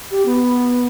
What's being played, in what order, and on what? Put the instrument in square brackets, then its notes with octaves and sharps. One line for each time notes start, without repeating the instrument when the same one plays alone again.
[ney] G4
B3